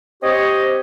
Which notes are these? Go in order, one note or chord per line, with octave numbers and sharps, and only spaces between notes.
C4 G4 C#5 D#5